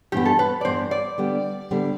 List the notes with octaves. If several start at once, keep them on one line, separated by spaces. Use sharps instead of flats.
G2 E3 B3 G4
A4
B4
D5
G2 E3 B3 C5
D5
D3 G3 B3
D3 G3 B3